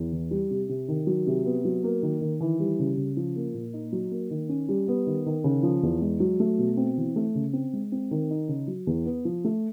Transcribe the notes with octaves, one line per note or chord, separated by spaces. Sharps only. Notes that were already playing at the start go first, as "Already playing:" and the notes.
Already playing: E2
E3
G3
C3
C3
D#3
F#3
C3
B3
F#3
A#3
D#3
D#3
E3
G3
C#3
C#3
F3
A#3
A#2
D#4
F#3
A#3
D#3
C#4
G3
B3
D#3
D#3
C#3
F3
E2
G#3
F#3
A3
B2
C4
E3
A3
C#3
C4
G#3
C4
D#3
D#4
C#3
F#3
E2
B3
F3
A3